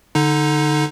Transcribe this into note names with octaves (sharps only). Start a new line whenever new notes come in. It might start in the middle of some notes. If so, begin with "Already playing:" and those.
D3 D#4